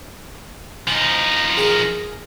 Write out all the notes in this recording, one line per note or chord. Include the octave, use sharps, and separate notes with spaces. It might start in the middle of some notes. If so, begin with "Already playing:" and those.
F3 D#4 G#5
G#4 A#4 G#5